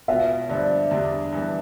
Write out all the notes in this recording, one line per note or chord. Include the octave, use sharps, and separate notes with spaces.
B2 B3 F4 E5
G2 D3 F3 D5
E2 D3 G3 D4
G2 E3 B3